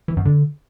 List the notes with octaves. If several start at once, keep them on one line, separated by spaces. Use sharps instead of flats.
E3
F#2
D3